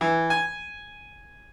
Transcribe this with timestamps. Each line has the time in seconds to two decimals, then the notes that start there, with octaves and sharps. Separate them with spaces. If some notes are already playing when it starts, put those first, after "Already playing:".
0.01 E3
0.30 G#5